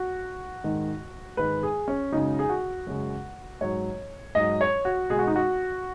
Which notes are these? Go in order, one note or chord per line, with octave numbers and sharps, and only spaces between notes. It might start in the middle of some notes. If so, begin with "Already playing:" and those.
Already playing: F#4
G#2 D#3 G#3
G#2 D#3 G#3 B4
G#4
C#4
F#2 C#3 G#3 D#4
G#4
F#4
F#2 C#3 G#3
G#2 F#3 C#5
G#2 F#3 D#5
C#5
F#4
B2 G#3 G#4
F#4
D#4
F#4